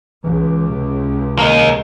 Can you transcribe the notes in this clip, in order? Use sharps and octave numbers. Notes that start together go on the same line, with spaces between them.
C#2 E3
C3
A#3 D#4